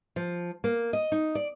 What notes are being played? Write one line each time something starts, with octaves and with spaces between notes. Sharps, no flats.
F3
A#3
D#5
D#4
D5